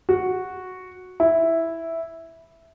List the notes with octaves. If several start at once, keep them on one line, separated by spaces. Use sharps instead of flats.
F#4
E4